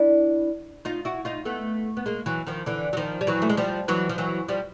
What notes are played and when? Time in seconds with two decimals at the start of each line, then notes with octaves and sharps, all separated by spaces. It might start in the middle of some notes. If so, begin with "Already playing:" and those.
Already playing: D4 E4
0.85 D#4 F4
1.05 E4 F#4
1.25 D#4 F4
1.45 A3 B3
1.97 B3
2.06 G#3 A#3
2.26 E3 F#3
2.47 D#3 F3
2.66 D3 E3
2.93 F#3
2.97 D#3 F3
3.21 G3
3.27 E3 F#3
3.42 A3
3.50 G#3
3.57 F3 G3
3.88 E3 F#3
4.09 F3
4.18 E3 F#3
4.48 F3 G3